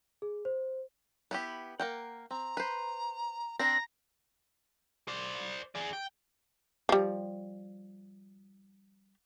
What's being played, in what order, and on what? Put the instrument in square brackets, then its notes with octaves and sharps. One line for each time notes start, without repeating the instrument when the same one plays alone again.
[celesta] G#4
C5
[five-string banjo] B3 E4 G4
A#3 F#5 G5
[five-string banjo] C4 [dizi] A#5
[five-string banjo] B4 C5
[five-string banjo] C4 D4 [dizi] A#5 [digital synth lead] A#6
[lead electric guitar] C5 D5
G#4 D5
G5
[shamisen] F3 G3